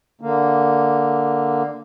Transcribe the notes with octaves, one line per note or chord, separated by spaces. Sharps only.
D3 A#3